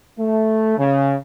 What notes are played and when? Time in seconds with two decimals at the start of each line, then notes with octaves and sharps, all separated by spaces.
0.19 A3
0.78 C#3